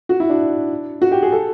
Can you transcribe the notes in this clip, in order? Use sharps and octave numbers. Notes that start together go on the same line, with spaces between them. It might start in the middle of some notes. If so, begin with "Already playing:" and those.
F#4
E4
D4
F#4
G4
G#4
A4